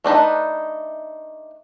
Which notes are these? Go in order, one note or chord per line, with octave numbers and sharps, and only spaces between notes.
A3 D4 D#4 B4